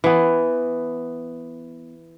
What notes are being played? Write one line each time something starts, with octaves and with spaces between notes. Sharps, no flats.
E3 B3